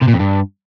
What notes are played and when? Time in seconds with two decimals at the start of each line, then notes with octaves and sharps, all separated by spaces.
0.02 C3
0.08 A#2
0.14 F2
0.20 G2